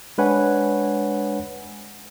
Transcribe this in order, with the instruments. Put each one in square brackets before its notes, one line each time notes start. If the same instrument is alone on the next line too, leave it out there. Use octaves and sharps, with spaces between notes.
[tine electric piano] G#3 D4 B4 C#5 F#5 G#5